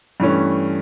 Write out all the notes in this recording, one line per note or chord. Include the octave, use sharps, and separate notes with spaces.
G2 E3 A3 C#4